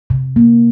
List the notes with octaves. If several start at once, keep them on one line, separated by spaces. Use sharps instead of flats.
C3
A#3